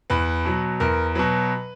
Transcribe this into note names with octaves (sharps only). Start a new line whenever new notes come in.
E2 B4
B2 F#3
E2 A#4
B2 F#3 B4